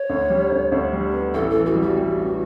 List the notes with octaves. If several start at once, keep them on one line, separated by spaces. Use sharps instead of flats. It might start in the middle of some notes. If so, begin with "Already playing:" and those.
Already playing: C#5
D2
G3
D2
D2
G3
B3
A1 A4
E3 A4
F#4
G3
F#4
G3
A1